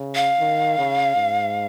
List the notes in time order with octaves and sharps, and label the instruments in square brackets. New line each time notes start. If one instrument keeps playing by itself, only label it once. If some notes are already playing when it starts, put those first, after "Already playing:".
Already playing: [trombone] C#3
[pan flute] F5
[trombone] D#3
C#3
G#2